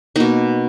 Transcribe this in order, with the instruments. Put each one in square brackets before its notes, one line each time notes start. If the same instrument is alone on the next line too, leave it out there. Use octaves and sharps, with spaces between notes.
[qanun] B2 A#3 D#4